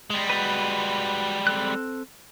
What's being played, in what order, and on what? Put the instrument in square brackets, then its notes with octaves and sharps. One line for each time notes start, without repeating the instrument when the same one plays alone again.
[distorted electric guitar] G3 G#3
[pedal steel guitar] F#4 B4
C4 A4 F#6